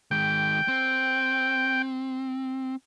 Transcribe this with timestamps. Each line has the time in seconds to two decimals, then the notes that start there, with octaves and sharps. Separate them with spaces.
0.11 D#3 G#3 G5
0.68 C4